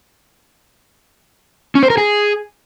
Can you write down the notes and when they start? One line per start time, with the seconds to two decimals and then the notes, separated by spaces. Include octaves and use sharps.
1.75 C#4
1.83 C5
1.90 A#4
1.98 G#4